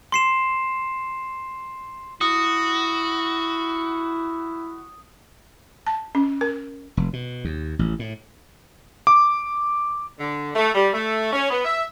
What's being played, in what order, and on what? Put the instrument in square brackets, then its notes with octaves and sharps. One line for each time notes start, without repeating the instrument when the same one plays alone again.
[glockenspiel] C6 C7 E7
[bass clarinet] E4 [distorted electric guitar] F#4 [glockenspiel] D#6
[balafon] A5
C#4
A#4
[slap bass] F1
B2
D#2
A1
A2
[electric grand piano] D6
[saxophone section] D3
A3
G3
A3
C#4
B3
E5